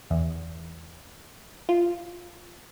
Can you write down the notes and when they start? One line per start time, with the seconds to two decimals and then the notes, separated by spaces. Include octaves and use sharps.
0.10 E2
1.69 F4